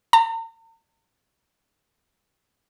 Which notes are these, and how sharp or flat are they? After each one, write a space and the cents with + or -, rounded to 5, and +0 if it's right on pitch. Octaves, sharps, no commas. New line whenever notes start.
A#5 -45